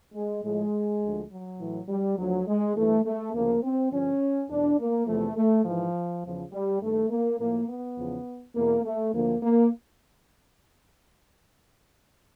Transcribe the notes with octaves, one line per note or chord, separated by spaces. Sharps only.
G#3
A2 F3 G#3
D2 D3 F3
F#3
A2 E3
G3
D2 D3 F3 F#3
G#3
G2 E3 A3
A3
D2 C#3 F3 A#3
C4
G2 D3 F3 C#4
E2 B2 D4
A#3
E2 C3 F3 A3
A3
G#2 E3 F3
E2 C#3 F3
G3
G2 D#3 A3
A#3
A2 F3 A#3
B3
E2 C#3 F3
E2 B2 A#3
A3
D2 D3 F3 A#3
A#3